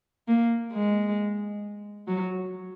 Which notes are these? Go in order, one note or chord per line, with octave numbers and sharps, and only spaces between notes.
A#3
G#3
F#3